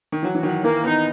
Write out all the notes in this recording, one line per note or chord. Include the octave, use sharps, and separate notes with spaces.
D#3
E3 F#3
E3
D#3 F#3
E3 A#3
B3 D#4